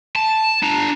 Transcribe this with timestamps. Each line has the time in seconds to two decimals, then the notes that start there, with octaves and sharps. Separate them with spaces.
0.16 A5
0.63 D4 A#5